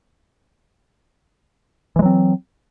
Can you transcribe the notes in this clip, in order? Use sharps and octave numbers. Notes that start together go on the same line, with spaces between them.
E3 F#3 G#3 C4